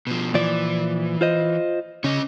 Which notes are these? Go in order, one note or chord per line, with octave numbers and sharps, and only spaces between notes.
B2 F3
A#2 E3 F3 D5
F4 C5 D#5
C#3 C#4 D#5